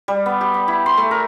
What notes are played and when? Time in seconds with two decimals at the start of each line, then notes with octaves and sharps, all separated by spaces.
0.08 G3
0.26 B3
0.41 G4
0.54 D6
0.68 E4
0.86 C6
0.97 A3
1.11 A#4